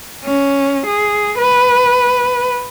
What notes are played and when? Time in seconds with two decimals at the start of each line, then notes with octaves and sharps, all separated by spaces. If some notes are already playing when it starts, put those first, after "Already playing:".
0.24 C#4
0.86 G#4
1.38 B4